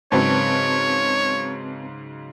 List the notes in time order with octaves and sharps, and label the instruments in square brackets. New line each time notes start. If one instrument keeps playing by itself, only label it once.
[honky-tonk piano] G#2 C#3 F#3 [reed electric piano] C4 B4 A5 [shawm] C#5